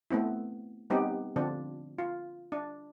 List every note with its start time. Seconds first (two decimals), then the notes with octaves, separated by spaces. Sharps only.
0.11 A3 B3 C4 E4
0.90 G3 B3 C4 D#4 G4
1.36 D3 F3 C4 D4
1.98 F4
2.52 D4